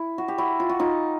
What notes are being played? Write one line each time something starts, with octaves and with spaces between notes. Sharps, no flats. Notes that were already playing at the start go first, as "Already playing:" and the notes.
Already playing: E4
F#4
G4
E4 F#4
F4
F#4
D#4 F4